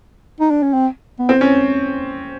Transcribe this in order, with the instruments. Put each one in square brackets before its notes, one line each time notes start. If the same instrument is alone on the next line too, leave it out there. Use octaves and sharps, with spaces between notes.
[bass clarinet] D#4
D4
C#4
C4
B3
[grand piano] C4
C#4